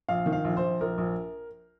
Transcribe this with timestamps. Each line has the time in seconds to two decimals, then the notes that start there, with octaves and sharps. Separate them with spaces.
0.09 A#1 F5
0.26 D#3
0.32 F5
0.45 A#1
0.57 C5
0.62 A#1
0.81 A#1 A#4
0.98 A#1